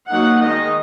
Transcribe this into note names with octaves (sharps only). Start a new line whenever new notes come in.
F#3 A#3 D#4 F#5
D#3 G#3 D#4 D#5